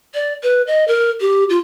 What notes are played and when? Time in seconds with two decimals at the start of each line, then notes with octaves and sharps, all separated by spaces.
0.14 D5
0.43 B4
0.67 D#5
0.88 A#4
1.20 G4
1.50 F4